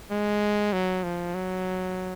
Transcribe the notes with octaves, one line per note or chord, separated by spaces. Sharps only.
G#3
F#3
F3
F#3